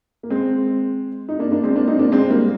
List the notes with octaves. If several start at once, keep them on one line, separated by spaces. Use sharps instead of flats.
A#3
G#3 C4
D#4
A#3 D4
A#3 D4
G#3 C4
A#3 D4
C4 D#4
A#3 D4
G#3 C4
G3 A#3